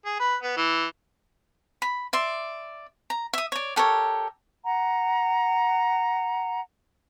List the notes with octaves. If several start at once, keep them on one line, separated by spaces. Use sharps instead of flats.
G#4
B4
B3
E3
B5
D5 E5 C6
A#5
E5 D#6
C#5 D5
G4 A4 A#4 C#5
F#5 A#5